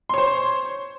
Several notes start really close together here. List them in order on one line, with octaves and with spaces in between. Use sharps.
C6 C#5 C5